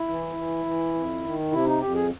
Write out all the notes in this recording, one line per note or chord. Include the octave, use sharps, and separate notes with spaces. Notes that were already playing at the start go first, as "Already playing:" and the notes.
Already playing: E4
E3
E3
E3
F2
D#3
C3 E4
D#4
F2 G4
G#4